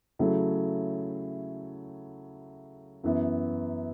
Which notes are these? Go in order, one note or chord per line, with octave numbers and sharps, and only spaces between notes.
C#3 F#3 A3 E4
F#2 E3 B3